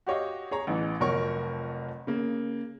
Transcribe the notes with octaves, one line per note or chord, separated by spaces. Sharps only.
F#4 G4 C#5 D#5 F5
G#4 C#5 A#5
A1 E3
F1 F2 F#3 A#4 C#5 C#6
C#3 A#3